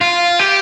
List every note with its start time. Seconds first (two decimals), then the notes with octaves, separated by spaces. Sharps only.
0.01 F4
0.39 G4